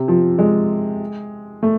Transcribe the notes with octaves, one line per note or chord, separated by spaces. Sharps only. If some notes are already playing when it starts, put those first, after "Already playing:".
Already playing: C3
F3
G#3
A3